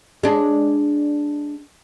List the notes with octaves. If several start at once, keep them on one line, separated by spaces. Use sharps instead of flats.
G#3 D4